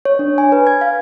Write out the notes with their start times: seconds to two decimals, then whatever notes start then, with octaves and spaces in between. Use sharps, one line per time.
0.05 C#5
0.19 D4
0.38 G#5
0.52 B4
0.67 G#6
0.81 F5